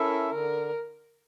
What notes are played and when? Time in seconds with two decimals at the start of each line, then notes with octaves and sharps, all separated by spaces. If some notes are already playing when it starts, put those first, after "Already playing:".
Already playing: C#4 E4 A4 A#4 E5
0.30 D3 A#4